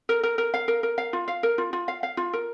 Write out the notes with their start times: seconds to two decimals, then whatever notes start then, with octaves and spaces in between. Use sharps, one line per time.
0.09 A#4
0.23 A#4
0.38 A#4
0.54 F5
0.68 A#4
0.83 A#4
0.98 F5
1.13 F4
1.28 F5
1.43 A#4
1.58 F4
1.73 F4
1.88 F5
2.03 F5
2.17 F4
2.33 A#4